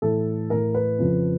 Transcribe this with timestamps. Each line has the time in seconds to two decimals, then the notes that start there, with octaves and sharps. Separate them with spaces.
0.02 A2 E3 A4
0.50 A2 E3 A#4
0.74 B4
0.99 F2 C#3 F3